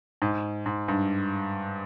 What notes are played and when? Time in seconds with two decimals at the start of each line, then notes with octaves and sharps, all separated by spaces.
0.22 G#2
0.66 G#2
0.88 G2